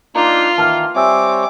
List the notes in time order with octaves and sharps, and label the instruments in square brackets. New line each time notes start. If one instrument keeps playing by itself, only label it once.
[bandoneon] A#3 D4 D#4 [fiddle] F4 [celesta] A#5
[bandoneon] D#3 E3 A#3 [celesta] A5 F6
[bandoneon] G3 C4 C#5 [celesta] E5 G#5 E6 [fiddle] D6